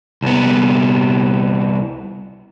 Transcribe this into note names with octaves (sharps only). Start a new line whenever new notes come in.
C2 B3